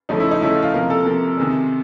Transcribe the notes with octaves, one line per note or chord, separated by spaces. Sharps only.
C#3 F3 A3 D#4
E4
D#4
C#3 F3 A3 E4
F4
F4
C3 F3 A#3 A#4
A4
C3 F3 A#3
C3 D#3 G#3